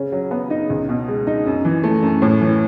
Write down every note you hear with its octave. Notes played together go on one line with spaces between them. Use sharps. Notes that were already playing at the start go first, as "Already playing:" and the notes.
Already playing: C#3 C#4
F#3
B3
D#4
C#2
B2
G#3
D#4
F#2
E3
A3
F#2
A2
E3